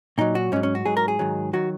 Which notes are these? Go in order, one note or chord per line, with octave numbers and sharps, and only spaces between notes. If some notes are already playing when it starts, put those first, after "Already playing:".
A#2 F#3 D#4
F#4
G#2 F#3 C#4
C#4
F#4
G#2 F#3 G#4
A#4
G#4
G#2 D#3 F#3
D#3 F#3 F#4